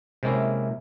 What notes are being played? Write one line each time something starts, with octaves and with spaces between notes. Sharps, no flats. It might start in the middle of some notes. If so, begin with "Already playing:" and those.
C3 G#3 A#3 C#4 E4